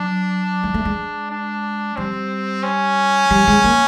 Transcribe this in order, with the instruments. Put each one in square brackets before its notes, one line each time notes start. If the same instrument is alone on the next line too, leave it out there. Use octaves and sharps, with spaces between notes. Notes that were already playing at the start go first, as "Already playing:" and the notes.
Already playing: [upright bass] F#3 [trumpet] D4
[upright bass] G#3
A3
G#3
[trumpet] D4
[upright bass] G3 [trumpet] C4
[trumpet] C#4
[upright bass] G3
G#3
A#3